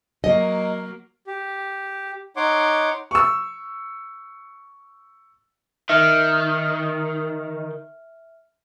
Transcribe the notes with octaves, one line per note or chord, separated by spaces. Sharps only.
F#3 A#3 A#4 D#5
G4
D#4 C#5 F#5 C6 D6
C#6 E6
D#3 E5 F6 C#7